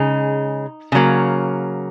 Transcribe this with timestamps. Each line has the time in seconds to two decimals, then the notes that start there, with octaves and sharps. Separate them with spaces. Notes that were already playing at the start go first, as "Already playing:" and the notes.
Already playing: C#3 G#3 D#4
0.92 C#3 F#3 A#3